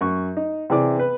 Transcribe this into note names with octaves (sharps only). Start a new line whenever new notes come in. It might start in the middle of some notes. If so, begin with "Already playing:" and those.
F#2 C#6
D#4
C3 E3 G#4 D5 D6
B3 B4